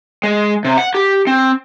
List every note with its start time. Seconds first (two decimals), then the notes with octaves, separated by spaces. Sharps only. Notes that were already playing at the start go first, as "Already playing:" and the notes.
0.23 G#3
0.65 C3
0.78 F#5
0.95 G4
1.27 C4